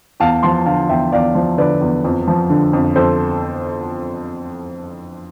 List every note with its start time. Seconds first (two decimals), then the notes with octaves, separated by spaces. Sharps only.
0.20 E2 F5 A5
0.43 F3 A5 C6
0.66 D3 F5 A5
0.89 E2 E5 G5
1.12 E2 D5 F5
1.35 F3
1.58 D3 B4 D5
1.81 E2
2.04 F2
2.28 F3
2.50 D3
2.73 F2
2.96 F2 A4 C5